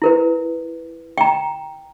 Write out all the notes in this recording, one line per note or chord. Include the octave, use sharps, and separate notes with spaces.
E4 A#4 B4
G5 A#5